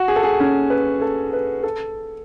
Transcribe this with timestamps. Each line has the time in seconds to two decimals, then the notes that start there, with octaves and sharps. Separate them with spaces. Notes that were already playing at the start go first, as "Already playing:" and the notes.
Already playing: F#4
0.08 G#4
0.16 A4
0.23 G#4
0.40 C#4
0.70 B4
1.02 A4
1.33 B4
1.63 A4